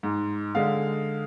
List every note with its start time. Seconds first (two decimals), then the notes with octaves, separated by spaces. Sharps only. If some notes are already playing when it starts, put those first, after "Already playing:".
0.03 G#2
0.55 D3 G#3 F5